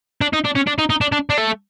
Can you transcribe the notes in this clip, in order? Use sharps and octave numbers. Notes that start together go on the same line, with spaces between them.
D4
D#4
D4
C#4
D4
D#4
D#4
D4
D4
D4
A3